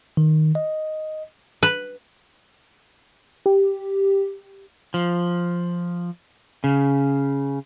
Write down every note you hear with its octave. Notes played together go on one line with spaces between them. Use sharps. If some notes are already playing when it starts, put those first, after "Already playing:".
D#3
D#5
B4
G4
F3
C#3